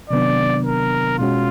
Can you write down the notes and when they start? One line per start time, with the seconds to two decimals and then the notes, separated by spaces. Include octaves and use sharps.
0.10 C3 D#3 F#3 B3 D4 D5
0.65 A#4
1.19 B2 G#3 C#4 F4 F#4